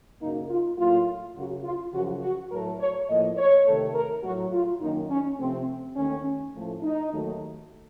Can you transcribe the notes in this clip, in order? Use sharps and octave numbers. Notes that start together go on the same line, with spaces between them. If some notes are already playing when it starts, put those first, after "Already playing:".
F#2 C#3 F#3 A#3 D#4
F4
A2 F#3 A#3 F4
F#2 C#3 F#3 F#4
F4
F#2 C#3 F3 F#4
F#4
A2 F#3 A3 A#4
C#5
A2 F3 A#3 D#5
C#5
C3 D#3 A3
A#4
A2 F#3 A3 F#4
F4
F#2 D#3 A#3 D#4
C#4
C3 F3 A3 C4
D#2 D#3 A3 C#4
A2 F3 A3
D#4
D#2 D#3 F#3 A3